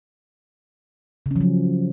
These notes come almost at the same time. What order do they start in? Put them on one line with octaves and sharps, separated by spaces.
C#3 C#4 F3 F#3